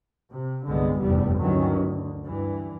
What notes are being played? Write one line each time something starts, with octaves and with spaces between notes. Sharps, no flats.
C3
C2 G2 D3 G#3 B3
F1 E2 G2 G3 B3
D2 G2 D#3 E3 F#3 C#4
D2
G2 E3